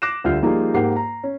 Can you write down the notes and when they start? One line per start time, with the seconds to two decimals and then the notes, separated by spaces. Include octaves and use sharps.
0.02 D6 F#6 A#6 C7 E7
0.24 D2 G3 F4 F6 G6 C7
0.42 F3 G3 A#3 D#4 F4 G#4
0.74 G#2 A#3 G4 A#4 F#5 C7
0.96 A#5
1.24 C#4